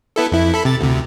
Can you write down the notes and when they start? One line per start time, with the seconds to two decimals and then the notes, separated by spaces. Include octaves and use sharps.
0.16 B3 E4 A4
0.32 F2 E4
0.54 A4 B5
0.65 C3 A6
0.81 D2 C3